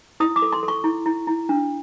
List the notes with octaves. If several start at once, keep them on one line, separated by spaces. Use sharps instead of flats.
E4 D#6
D6
A4
C6
A4
C#6
E4
E4
E4
D4